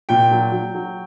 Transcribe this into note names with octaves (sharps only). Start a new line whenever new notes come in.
A#2 G5
F#3
F#3
F#3